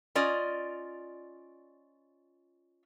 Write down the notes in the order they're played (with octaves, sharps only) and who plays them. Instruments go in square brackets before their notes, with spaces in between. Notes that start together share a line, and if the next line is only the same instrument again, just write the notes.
[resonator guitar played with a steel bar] C#4 F4 D5 D#5